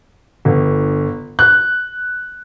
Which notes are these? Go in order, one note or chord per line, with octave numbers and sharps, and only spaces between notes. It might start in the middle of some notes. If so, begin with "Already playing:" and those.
G1
F#6